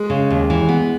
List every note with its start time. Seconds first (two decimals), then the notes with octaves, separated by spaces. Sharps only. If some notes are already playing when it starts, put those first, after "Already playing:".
Already playing: G#3
0.10 C#3
0.30 D#2
0.50 E3
0.69 B3